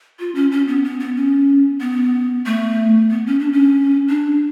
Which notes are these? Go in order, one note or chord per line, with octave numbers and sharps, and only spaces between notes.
F4
C#4
C#4
B3
B3
B3
C#4
B3
A3
B3
C#4
D4
C#4
D4